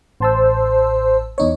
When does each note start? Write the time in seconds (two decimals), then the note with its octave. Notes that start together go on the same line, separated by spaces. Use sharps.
0.20 A1 C5 A5 E6
1.38 E2 D#4 C#5